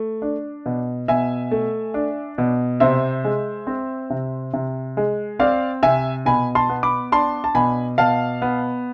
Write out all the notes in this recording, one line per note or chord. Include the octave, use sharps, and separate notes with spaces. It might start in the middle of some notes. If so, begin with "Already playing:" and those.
Already playing: A3
D4
B2
B2 E5 G#5
A3
D4
B2
C3 C5 E5
G#3
C4
C3
C3
G#3
C4 D5 F5
C3 E5 G#5
B2 G#5 B5
A5 C6
B3
B5 D6
D4 A5 C6
A5
B2 G#5 B5
B2 F5 A5
B3